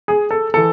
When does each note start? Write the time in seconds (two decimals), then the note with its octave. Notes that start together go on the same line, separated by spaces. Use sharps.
0.08 G#4
0.31 A4
0.54 E3 A4